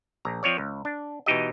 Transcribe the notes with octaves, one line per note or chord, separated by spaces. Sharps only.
A#1 A#5
F3 C4 C#5 D5
C#2
D4
B2 E3 D#4 G4 D#5